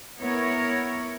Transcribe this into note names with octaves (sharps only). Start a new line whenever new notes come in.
B3 E4 A#4 C#5